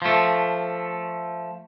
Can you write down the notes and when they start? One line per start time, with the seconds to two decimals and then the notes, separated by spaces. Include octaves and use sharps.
0.02 F3 A3